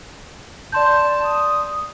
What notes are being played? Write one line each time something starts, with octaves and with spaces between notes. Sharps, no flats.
D5 A5 C6 G6
D#6